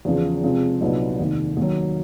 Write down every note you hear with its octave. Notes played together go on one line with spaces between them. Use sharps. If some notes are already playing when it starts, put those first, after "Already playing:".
E2 C#3 F3
C3 F3 G#3 C4
C2 A#2 F#3 B3 D#4
F1 D#2 D#3
D#2 D#3 F#3